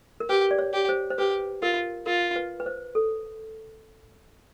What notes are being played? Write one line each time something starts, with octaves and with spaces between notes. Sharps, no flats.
A#4
G4 B4
D5
C#5
G4
C5
C5
G4 B4
F4 A#4
F4 A#4
B4
B4
C5
A4